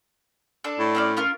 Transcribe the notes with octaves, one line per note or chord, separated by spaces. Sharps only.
D4 A4
A2
C4 C#4 D5
C#4 F4 A#4